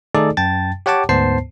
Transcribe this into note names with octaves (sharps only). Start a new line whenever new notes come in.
D#3 A3 D#4 G#4 A4 D5
F#2 G5 A5 A6
G4 C#5 F#5 G5 A5 D6
D2 G#2 B3 C5 A5 C7